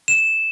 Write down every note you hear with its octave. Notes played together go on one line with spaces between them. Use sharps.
E7